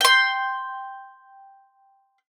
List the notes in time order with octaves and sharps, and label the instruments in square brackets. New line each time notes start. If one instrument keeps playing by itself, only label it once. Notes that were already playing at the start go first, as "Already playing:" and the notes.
[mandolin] G5 C6